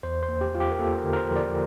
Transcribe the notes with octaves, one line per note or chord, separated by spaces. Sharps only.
E2 C5
C5
A#3
G4
E2 F4
G4
A#4
A#3 A4
A#4
D3
A#4
C5
F3
D5